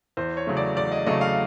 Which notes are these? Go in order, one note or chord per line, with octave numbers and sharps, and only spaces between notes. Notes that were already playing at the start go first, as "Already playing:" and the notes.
E2 C5
C#5
C#3 F#3 A3
D5
E2 D5
D#5
C#3 F#3 A3 D#5
F5